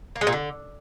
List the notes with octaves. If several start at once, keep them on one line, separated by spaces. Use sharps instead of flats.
A#3
G#3
A#2
D3